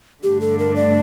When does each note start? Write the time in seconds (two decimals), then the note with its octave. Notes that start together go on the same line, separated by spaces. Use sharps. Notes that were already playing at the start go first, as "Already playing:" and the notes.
0.23 G2 D3 A3 D4 G4
0.41 A4
0.59 A#4
0.76 D5